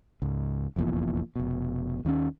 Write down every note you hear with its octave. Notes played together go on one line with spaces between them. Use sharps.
C#2 G#2
F1 A#1 E2 A#2
F1 B2
D#2 D#3 A3 C#4